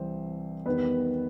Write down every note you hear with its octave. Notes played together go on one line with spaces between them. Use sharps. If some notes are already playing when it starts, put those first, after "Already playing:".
Already playing: C2 C3 E3 G3 C4 C5
E2 D#3 G3 B3 B4